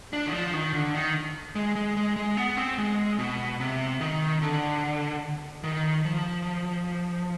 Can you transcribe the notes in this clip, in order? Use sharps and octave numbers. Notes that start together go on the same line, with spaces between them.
D4
D#3
F3
D#3
D3
D#3
G#3
G#3
G#3
G#3
B3
C4
G#3
B2
C3
D#3
D3
D#3
F3